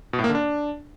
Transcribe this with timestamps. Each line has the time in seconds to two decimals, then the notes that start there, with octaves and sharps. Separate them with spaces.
0.13 B2
0.19 A2
0.24 A#3
0.29 D3
0.35 D4